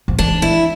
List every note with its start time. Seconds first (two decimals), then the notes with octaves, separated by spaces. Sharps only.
0.08 F3
0.19 E3 D4
0.42 E4